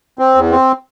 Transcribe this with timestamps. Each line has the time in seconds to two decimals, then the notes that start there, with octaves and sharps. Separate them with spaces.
0.19 C4
0.35 E2
0.51 C4